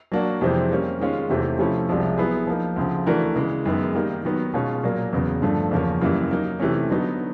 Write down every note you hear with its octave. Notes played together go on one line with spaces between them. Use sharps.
F#3 A#3 D4 F#4
F2 C3 E3 G#3 C4
G3 A#3 C#4
D#3 G#3 C#4 F4
E2 C3 E3 A3 C4
C3 F3 A3 C#4 E4
C2 C3 F3 G#3
F#3 B3 E4 G#4
F3 A#3 D#4
D2 C#3 F3
E3 A3 D4 F#4 A#4
C#3 E3 G#3
F#2 D#3 G#3 B3
D#3 G3 A#3 D#4
D#3 F#3 B3
B2 G#3 C#4 F4
A#2 F#3 A#3
E2 C#3 F#3 B3
G2 D3 F3 A3
E2 C#3 F3 A#3 C#4
F#2 C#3 E3 G3 A#3
F#3 A#3 D#4
C3 E3 A3 C#4
D3 F#3 B3 D#4